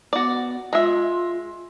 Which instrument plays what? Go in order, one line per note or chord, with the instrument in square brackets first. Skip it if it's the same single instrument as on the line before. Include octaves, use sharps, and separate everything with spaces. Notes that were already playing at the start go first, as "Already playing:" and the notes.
[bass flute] B3 [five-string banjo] F#4 D5
[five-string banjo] G#3 E5 [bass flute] F4